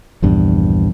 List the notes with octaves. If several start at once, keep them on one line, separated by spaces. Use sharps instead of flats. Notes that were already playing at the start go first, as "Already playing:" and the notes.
A#1 E2 G2